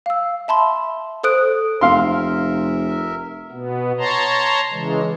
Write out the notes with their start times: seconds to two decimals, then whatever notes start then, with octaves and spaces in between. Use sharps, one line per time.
0.06 F5 E6
0.48 E5 A5 B5 C6
1.23 A4 C5 D#6 F#6 D7
1.81 F1 A#4 E5 F5 C6
3.51 B2 B3
3.98 C#5 A5 A#5 C6
4.72 C#3 E3 G#3